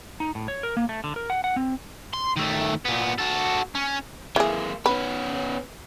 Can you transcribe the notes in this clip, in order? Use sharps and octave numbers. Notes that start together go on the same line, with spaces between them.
D#4
A2
C#5
A#4
A#3
A3
D3
A#4
F#5
F#5
C4
C6
D#3 A3
A#2 B3
F#4 A4
C#4
E3 G#3 A#3 G#4
B3 C#4 B4